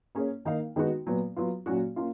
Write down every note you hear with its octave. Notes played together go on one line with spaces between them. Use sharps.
A#3 C#4 G#4 C#5
D#3 A#3 D#4 A#4 F5
D#3 G#3 B3 D#4 F#4
A#2 F#3 B3
F#3 B3 F4
A#2 F#3 C#4 F#4
A#3 C#4 F4